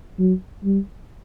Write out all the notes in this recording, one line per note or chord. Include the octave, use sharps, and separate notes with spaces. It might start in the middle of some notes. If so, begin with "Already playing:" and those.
F#3
G3